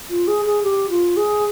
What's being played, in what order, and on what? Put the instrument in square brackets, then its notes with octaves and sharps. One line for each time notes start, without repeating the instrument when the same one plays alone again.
[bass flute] F4
G#4
G#4
G4
F4
G#4